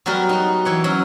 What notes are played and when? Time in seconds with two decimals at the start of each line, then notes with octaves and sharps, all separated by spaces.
0.06 F#3 G3 B3 F#4 A#4
0.29 D#4 F#4
0.65 E3 C#5 F#5
0.84 F#3 C#4